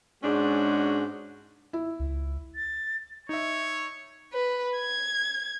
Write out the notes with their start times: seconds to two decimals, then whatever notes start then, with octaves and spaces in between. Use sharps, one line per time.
0.23 G#2 G#3 C#4 D4 F#4
1.73 E4
1.99 C#2
2.55 A6
3.29 D#4 C#5 E5
4.33 B4
4.77 G#6